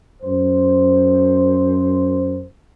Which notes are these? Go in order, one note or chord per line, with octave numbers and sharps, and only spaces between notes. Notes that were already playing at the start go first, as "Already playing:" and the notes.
F#2 C5